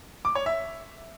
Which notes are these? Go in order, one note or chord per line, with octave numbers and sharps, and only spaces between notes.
D6
C#5
E5